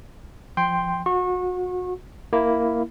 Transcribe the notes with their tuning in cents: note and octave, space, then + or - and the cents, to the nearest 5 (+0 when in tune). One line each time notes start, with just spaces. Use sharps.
F3 +0 G5 +5 C6 +0
F#4 -30 C#6 -30
A#3 +0 E4 +0